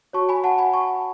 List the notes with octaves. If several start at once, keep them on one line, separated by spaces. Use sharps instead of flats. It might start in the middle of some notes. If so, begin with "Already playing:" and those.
F#4 C#5 A5 C#6
G#5 B5
F#5 A5
G#5 B5
A5 C#6